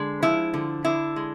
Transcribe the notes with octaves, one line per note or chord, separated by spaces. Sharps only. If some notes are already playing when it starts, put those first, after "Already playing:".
Already playing: D3 G#3
F3 E4
D3
D3 E4
G#3